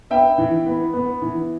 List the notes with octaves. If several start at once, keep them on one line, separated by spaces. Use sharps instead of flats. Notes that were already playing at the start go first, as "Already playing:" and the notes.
B3 E5 G5
E3
B3
B3
E3